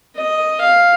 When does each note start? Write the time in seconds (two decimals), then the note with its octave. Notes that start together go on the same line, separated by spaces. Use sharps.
0.16 D#5
0.62 F5